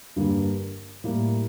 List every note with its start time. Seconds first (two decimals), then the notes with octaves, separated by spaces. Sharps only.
0.16 G2 D3 G3 A#3
1.04 A2 G3 A#3